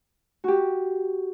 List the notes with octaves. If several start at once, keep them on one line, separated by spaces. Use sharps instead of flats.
F#4 G4